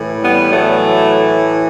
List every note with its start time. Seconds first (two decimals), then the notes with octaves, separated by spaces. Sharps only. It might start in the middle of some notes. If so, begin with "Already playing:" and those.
Already playing: A2 E3
0.22 G3 B3
0.52 F#3 A3